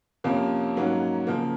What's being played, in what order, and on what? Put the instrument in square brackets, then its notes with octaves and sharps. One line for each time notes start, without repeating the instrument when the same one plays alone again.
[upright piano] F2 C3 F3 A#3 C#4
G#2 F#3 A#3 C#4 F#4
C#3 F3 A#3